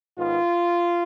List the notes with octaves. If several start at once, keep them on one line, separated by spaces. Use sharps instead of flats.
G#2 D#3 B3 F4